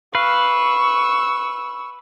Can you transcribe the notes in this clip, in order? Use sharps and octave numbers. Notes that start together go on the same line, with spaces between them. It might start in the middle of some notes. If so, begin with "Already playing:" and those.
B4 F5 C#6 E6